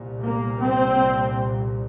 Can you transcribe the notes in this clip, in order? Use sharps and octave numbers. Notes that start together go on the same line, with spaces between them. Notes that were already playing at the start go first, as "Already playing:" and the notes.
Already playing: C2 A#2
A#3
C4